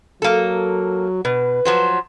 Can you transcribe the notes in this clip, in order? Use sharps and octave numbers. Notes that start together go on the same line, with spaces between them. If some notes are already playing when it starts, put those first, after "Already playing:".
F#3 A#3 A4
B2 B4
F3 F#3 C5